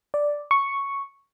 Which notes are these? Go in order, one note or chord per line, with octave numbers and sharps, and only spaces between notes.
D5
C#6